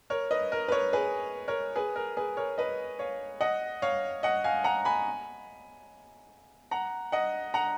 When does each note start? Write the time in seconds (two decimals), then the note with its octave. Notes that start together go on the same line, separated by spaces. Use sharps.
0.10 A#4 C#5
0.31 B4 D#5
0.52 A#4
0.68 B4
0.72 A#4 C#5
0.93 G#4 B4
1.48 A#4 C#5
1.76 G#4 B4
1.96 A#4
2.17 G#4 B4
2.37 A#4 C#5
2.58 B4 D#5
2.99 C#5 F5
3.41 D#5 F#5
3.82 C#5 F5
4.23 D#5 F#5
4.44 F5 G#5
4.64 F#5 A#5
4.85 G#5 B5
6.71 F#5 A#5
7.12 D#5 F#5
7.54 F#5 A#5